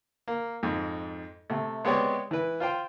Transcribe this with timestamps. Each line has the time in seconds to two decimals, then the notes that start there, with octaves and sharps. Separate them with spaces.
0.28 A#3
0.63 F2 G#2
1.50 C3 A3
1.85 G#3 B3 C4 G4 C#5 D5
2.31 E3 B4
2.60 F4 C5 G5